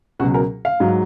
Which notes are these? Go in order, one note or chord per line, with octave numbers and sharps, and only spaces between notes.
C#2 B2 F#3 F#4
A#4
F5
G#2 F#3